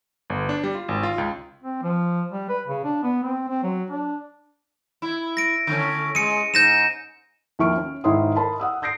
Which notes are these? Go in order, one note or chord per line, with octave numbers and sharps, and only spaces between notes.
G1
D4
G3
F4
G#1
F4
C#2
C4
F3
G3
B4
C#3
D4
B3
C4
C4
F#3
D4
E4
A#6 D7
D3 A3 C#4
G#3 C#7 D#7
G#2 G6 A#6 E7
D#2 F3 E5 C#6 F6 D7
C#4
G#2 D#3 E4 C#5 C6 D#6
A#4 D#5 A5 B5 C6
F#5 D#6 E6
D#6 G6 A#6 C7 D7